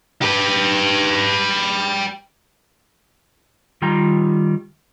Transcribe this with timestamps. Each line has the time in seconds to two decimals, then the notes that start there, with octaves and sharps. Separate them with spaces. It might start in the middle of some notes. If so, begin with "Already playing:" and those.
0.22 G4 B4
3.82 D#3 G3 F4 G5 A#5